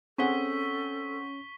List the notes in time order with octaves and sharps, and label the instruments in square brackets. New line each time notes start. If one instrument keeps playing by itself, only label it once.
[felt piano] C4 G#4 F#5 [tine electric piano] C#4 [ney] A4 [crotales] C#6 B6 G7